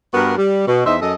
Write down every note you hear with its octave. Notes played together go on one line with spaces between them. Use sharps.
G2 B3 F#4 A#4
G3
B2
E2 D#4 C5 E5
F#2 A4 D#5